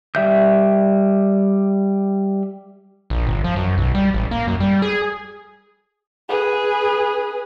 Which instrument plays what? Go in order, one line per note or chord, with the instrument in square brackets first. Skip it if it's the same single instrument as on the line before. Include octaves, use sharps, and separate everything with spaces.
[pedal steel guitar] G3 E5 G6
[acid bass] A#1
G1
F3
F#2
B1
G3
A1
A#3
F#2
G3
G#4
[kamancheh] G#4 B4